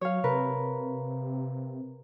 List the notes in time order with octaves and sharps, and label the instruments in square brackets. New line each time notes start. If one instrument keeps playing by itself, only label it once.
[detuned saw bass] F#3 [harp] C#5 F5
[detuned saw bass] C3 [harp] A#4 B4